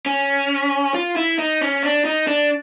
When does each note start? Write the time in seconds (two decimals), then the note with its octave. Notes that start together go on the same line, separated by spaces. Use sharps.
0.06 C#4
0.94 F4
1.16 E4
1.39 D#4
1.61 C#4
1.83 D4
2.05 D#4
2.28 D4